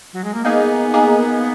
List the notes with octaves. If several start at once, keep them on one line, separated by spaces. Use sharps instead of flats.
F#3
G#3
A#3
A#3 B3 D#4 G#4
A#3 D#4 G#4